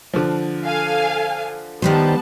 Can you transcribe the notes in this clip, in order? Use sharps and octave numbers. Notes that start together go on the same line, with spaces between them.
D3 F3
A4 F5 G#5
D#3 G3 B3 C5 A5